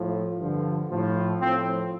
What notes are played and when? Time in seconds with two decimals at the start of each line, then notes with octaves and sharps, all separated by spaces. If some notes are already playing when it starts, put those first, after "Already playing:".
Already playing: A2 F3
0.38 G2 D3 F3
0.89 A2 F3
1.40 A2 F3 C4